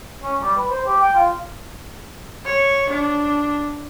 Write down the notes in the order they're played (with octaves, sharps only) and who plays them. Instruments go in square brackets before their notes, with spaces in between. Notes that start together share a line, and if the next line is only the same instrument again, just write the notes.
[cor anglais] C#4
G3
B4
C5
G4
G5
F4
[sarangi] C#5
D4